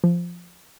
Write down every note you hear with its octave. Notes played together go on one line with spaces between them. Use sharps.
F3